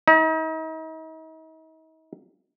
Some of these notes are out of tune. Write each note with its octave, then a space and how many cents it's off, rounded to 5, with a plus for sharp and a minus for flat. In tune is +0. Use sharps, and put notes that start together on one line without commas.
D#4 +40